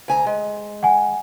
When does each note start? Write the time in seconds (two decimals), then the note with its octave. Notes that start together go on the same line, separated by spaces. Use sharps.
0.08 D2 G#5 A#5
0.26 G#3
0.83 F#5 G#5